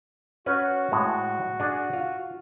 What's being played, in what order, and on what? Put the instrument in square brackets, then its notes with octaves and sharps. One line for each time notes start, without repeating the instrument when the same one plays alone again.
[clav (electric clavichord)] C#4 B4 [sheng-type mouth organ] F#4
[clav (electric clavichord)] A2 G#3
D4 G#4
F4